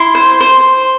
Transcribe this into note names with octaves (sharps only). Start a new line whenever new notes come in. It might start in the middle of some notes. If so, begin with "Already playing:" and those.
Already playing: E4 C6
C5
C5